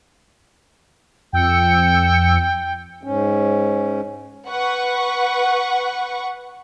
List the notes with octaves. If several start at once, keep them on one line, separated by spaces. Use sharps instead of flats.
F2 G5 E6 C#7
G#2 C#4
B4 F#5 C#6